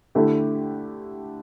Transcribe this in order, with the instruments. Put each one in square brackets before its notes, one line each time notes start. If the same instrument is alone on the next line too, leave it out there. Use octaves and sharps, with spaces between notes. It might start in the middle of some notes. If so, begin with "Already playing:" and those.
[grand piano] D3 A3 E4 G4